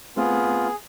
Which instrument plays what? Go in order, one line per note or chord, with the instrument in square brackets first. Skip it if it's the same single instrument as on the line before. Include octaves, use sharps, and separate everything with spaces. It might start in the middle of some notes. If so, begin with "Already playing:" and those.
[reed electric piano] A3 C4 F6 [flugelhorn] B3 [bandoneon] F4 [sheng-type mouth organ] G#4